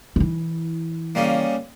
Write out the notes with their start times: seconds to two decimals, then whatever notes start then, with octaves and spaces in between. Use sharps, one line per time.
0.16 E3 E4
1.15 C#3 G3 A#3